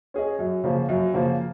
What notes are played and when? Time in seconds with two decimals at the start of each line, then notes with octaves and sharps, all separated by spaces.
0.14 C#4 G#4 D#5
0.39 F#2
0.64 C#3 F3 A#3
0.89 F#2
1.14 C#3 F3 A#3